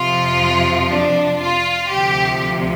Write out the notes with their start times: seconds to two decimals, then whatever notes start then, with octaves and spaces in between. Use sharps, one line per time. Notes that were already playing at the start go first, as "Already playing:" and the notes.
Already playing: F2 C3 F3 F4
0.91 D4
1.41 F4
1.91 D2 C3 F3 G4